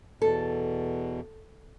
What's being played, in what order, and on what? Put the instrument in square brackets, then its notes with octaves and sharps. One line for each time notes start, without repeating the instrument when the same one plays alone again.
[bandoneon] E2 B2 [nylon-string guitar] A4